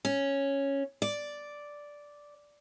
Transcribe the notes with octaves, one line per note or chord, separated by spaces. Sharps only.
C#4
D5